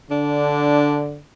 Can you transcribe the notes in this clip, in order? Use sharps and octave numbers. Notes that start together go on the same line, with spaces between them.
D3 D4